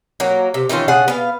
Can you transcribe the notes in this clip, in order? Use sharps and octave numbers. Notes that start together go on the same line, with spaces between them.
F#3 A#3
C3
D#3 E3 C#4 F4
C#3 D4 G#4 F#5
B3 F5